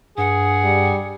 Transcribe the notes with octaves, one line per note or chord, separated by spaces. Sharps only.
G2 G#4 F#5
G3